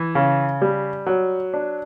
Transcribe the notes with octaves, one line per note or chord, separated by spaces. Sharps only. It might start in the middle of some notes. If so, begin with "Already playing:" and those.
Already playing: E3
C#3
G3
F#3
D4